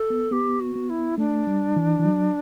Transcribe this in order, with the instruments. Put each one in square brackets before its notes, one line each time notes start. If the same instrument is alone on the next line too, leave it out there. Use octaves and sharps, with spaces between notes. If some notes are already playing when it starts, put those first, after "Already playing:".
Already playing: [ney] A4
[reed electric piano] B3
[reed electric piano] B3 [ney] G4
[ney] F#4
[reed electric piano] B3
[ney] E4
[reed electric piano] A3 [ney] D4
[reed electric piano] G3
E3
E3
F#3